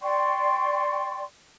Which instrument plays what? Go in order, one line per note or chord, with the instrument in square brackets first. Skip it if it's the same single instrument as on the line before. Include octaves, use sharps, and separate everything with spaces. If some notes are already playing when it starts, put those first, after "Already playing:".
[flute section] D5 G5 C6 C#6